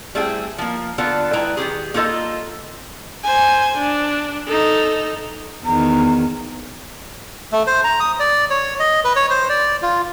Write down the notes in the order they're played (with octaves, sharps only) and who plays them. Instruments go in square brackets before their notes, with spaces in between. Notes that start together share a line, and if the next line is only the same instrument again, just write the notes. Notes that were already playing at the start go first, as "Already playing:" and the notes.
[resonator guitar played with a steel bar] G3 A3 C4 E4 G#4 G5
F3 A#3
D3 B3 D4 F4 A4
G#3 E4 B4 D5 G5 A#5
D#3 D#4 G4 G#4
A#3 D#4 F4 A4 D#5
[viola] C5 G#5
D4
D#4 A4
[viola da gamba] E2 D#3 [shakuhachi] A#5
[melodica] A3
C5
A#5
D#6
D5
C#5
D#5
B4
C#5
C5
D5
F4